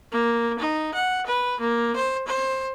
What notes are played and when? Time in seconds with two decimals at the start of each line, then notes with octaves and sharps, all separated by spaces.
0.12 A#3
0.59 D#4
0.94 F#5
1.26 B4
1.60 A#3
1.96 C5
2.28 C5